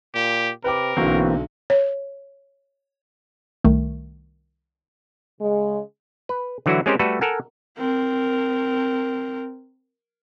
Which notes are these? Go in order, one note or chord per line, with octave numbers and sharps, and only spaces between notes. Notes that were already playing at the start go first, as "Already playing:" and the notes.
A#2 G4
C3 A#4 B4 G5 D6
B1 D3 E3 F#3 A#3 C4 F#4
C#5
C2 D#3 A3
C#3 G#3
B4
D3 E3 F#3 E4 F#4
G#3 C4 C#4 G4 A#4 C5
G3 A3 F#4 A4 B4
A4 A#4 F#5 G#5
C4 A#4